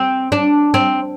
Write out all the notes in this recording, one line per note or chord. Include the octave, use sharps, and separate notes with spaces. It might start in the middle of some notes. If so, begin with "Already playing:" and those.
Already playing: C4
D4
C4